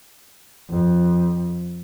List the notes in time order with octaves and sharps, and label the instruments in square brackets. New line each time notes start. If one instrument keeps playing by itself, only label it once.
[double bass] F2